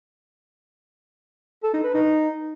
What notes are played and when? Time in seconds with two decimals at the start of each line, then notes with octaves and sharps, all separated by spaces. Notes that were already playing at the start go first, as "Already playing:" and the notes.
1.63 A4
1.74 D#4
1.84 B4
1.94 D#4